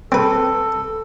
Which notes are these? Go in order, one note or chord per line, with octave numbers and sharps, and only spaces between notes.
C4 A4 B4